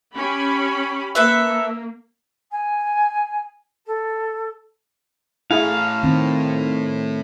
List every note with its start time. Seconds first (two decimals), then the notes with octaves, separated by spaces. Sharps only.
0.15 C#4 G4 B5
1.15 A#3 A4 B4 E5
2.51 G#5
3.86 A4
5.51 A2 E4 G#4 E5 F5 G#5
6.03 D#3 C4